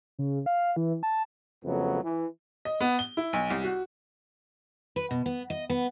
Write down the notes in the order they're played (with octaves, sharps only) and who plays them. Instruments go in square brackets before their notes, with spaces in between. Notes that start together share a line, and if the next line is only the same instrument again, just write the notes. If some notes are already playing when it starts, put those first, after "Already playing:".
[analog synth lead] C#3
F5
E3
A5
[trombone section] F2 C#3 F#3 A3 B3
E3
[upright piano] D#5
B3
G7
E4
B1
C2
F#4
[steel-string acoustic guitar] B4
B2
B3
D#5
B3